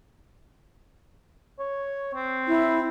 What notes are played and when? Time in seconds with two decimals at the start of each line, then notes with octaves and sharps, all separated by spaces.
1.59 C#5
2.14 C4
2.48 E4